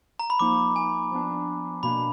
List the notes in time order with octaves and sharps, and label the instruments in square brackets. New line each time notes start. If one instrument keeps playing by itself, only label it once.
[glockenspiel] A#5
B5
[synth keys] F3 A#3 D#4 [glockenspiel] D6
[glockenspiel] G#5
[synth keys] F3 B3 D4
[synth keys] B2 A#3 D4 [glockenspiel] B5